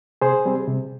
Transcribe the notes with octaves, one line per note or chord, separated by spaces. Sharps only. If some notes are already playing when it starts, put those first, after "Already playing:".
C3 G#4 C5
G3 C4
C3